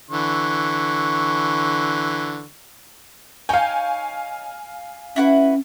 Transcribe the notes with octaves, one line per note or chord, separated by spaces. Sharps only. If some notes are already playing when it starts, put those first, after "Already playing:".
D3 E3 C#6
D#4 C#5 F5 G5 G#5
C#4 E4 F#4 B4